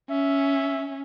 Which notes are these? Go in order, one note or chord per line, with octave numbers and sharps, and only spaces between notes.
C#4 E5